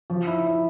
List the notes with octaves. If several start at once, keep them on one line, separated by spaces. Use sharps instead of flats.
F3
E4
E4